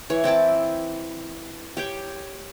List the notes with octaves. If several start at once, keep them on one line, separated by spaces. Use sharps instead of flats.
E3 C#5
C4 E4 G5 A5
G4 C#5 G5